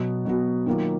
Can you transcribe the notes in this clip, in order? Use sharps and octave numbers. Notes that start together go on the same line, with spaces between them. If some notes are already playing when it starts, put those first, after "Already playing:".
Already playing: B2 F#3 B3 F#4
B2 F#3 B3 F#4
D#3 F#3 A#3 F4